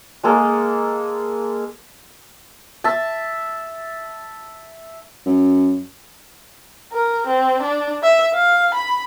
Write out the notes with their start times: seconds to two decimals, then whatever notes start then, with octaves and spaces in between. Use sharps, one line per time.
0.24 G#3 A#3 G#4 A4
2.84 E5 A5
5.26 F#2
6.93 A#4
7.27 C4
7.62 D4
8.03 E5
8.34 F5
8.74 B5